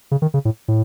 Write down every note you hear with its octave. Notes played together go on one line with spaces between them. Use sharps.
C#3
D#3
C#3
A2
A2